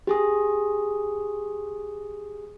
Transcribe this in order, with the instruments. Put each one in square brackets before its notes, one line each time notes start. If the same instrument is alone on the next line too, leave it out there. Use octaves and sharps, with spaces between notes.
[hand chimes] G4 G#4 D#6